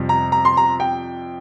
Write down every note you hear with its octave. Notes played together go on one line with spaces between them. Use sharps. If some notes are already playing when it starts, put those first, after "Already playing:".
Already playing: F2 C3 G3
A#5
A#5
C6
A#5
G5